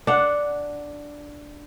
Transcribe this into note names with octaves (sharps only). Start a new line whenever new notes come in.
D4 F#5